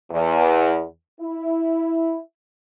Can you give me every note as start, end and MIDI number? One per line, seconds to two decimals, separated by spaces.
0.11 0.83 40
1.20 2.19 64